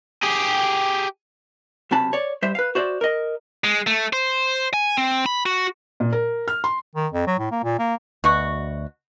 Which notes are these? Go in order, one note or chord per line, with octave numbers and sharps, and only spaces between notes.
G4 G#4
B1 C3 C#4 A5 B5
C#5 D5
G3 C5 E5
B4 F5
F#4 C5 D5 E5
A#4 D#5
G#3
A3
C5
G#5
C4
B5
F#4
A#2
A#4
F6
C6
D#3
F2
F#3
A2
A#3
A#2
A#3
D2 B2 F#4 C#6